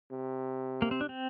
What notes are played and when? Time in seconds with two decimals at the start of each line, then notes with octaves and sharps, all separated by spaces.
0.12 C3
0.82 A#3
0.91 C4
1.01 D4
1.09 C4